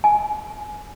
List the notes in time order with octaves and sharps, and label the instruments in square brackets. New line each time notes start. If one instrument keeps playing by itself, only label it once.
[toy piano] G#5